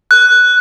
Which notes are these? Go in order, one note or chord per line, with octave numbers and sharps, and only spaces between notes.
F#6